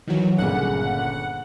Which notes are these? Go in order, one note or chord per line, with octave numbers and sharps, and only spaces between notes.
D#3 E3 F#3
G1 A#2 C#3 F#5